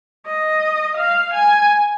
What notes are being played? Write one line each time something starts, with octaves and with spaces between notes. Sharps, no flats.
D#5
F5
G#5